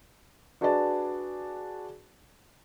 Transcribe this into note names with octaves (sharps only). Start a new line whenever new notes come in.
D4 F#4 G#4 B4 D5 A5